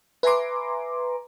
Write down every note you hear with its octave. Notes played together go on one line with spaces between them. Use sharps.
B4 E5 G#5 A#5 C6 D6